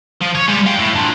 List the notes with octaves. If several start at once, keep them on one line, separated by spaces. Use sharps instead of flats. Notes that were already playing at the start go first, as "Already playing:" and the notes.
F3
C#5
G3 G#3
F5 G5
A2
D4 F4